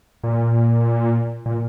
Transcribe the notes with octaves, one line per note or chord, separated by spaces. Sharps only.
A#2
A#2